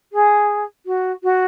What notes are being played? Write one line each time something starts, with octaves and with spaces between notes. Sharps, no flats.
G#4
F#4
F#4